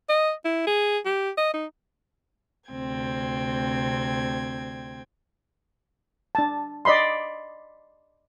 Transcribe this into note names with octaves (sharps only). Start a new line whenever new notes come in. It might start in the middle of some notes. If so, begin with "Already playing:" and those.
D#5
E4
G#4
G4
D#5
D#4
D2 C3 C4 G5 G#6
D4 A5
D5 D#5 B5 C6